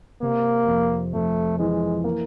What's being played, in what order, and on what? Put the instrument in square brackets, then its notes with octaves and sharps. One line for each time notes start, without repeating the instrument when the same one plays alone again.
[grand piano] C3 [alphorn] A#3
[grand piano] F2
[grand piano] F2 [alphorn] A3
[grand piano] E3 [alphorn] G#3
[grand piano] A#3